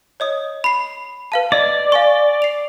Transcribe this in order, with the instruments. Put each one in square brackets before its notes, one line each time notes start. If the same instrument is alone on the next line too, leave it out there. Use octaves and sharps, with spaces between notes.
[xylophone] C#5 D#5 D#6
B5 C7
B4 F5 A5
[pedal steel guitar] D5 [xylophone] D#5
[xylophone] F5 G#5 C#6
C7 F7